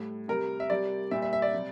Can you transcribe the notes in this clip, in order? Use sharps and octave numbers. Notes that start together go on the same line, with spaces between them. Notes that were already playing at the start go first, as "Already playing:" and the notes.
Already playing: A2 G3
C3 G3 A#4
E5
C3 G3 D5
A#2 G3 E5
E5
E5
D5
C3 G3